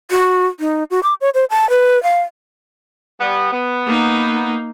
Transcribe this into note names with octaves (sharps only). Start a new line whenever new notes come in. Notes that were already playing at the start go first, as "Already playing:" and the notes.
F#4
D#4
F#4
D6
C#5
C5
A5
B4
F5
G3 B3
B3
A#3 D#4